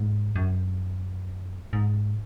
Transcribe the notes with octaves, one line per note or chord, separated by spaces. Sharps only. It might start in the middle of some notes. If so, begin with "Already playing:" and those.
Already playing: G#2
F#2
G#2